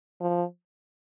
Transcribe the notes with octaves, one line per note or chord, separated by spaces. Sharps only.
F3